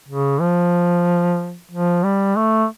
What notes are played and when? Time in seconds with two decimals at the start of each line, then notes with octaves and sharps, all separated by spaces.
0.08 C#3
0.40 F3
1.71 F3
2.04 G3
2.36 A3